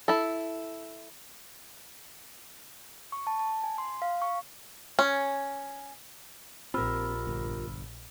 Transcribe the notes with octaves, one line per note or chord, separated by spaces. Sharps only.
E4 A4
C#6
A5
A5
G#5
C6
F5
C#6
C#4
A#1 C4 F4 G4 A#4 B5 E6 F6
G1